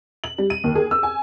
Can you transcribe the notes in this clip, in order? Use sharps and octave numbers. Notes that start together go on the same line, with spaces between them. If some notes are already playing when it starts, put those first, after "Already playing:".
F#7
G3
D#7
D#2
G#4
E6
G#5